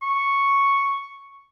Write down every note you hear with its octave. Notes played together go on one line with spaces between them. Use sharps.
C#6